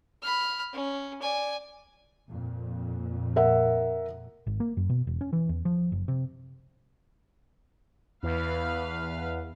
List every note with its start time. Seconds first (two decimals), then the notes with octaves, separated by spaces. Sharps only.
0.22 B5 F6
0.73 C#4
1.22 D5 G#5
2.29 F2 A#2
3.36 A#4 E5 F#5
4.47 G#1
4.60 A#3
4.77 F#2
4.89 B2
5.07 E1
5.21 C#4
5.33 E3
5.49 E2
5.65 F3
5.92 F#1
6.08 C3
8.23 E2 B4 F5